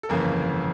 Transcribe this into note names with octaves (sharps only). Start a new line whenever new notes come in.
A4
G1 F2 C#3 E3 A#3 A#4